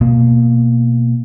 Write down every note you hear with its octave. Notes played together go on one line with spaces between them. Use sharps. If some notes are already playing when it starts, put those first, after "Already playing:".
B2 A#3